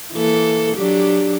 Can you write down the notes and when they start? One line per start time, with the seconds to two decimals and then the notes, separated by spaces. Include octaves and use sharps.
0.13 E3 A#3 A4
0.76 F#3 D4 G4